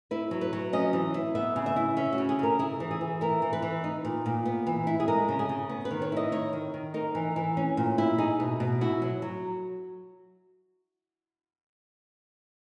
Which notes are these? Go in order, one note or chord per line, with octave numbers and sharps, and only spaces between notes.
E4 B4
F#3
B4
F#3
C#4 D#5
E3
E4
B3 E5
C#3
E5
E4
C#4 E5
F#4
C#3
G#4
C#3 A#4
E4 G#4
E3
G#4
E3
E4 A#4
E3
B4
E3
D#4
A#2
A#2
B3
E3
E4
G#4
G#3 A#4
C#3
G#4
C#3
B3
B4
D#3
C#5
E4 D#5
D#4 C#5
D#3
D#3
D#4 A#4
E3
E3
C#4
A#2
E4
D#4 G#4
B2
B2
E4 F#4
F#3
F#3